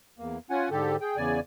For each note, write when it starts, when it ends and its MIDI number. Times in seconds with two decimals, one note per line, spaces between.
0.19 0.38 40
0.19 0.38 58
0.50 0.69 61
0.50 0.69 65
0.50 0.69 78
0.50 0.69 80
0.71 0.96 44
0.71 0.96 50
0.71 0.96 67
0.71 0.96 69
1.01 1.17 68
1.01 1.17 79
1.17 1.40 40
1.17 1.40 49
1.17 1.40 74
1.17 1.40 80